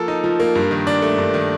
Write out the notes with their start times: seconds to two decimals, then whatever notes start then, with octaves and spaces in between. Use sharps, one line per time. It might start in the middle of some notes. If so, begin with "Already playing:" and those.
Already playing: F3 A#3 A4
0.08 D#4
0.24 F3
0.40 A#3
0.55 G2
0.71 D#3
0.87 D4
1.02 A3
1.18 G2
1.34 D#3